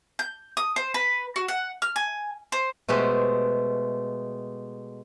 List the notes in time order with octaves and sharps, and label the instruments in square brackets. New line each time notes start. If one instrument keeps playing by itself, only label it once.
[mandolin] G6
D#6
C5
B4
F#4
F#5
F6
G#5
C5
[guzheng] B2 G#3 A3 G4 C5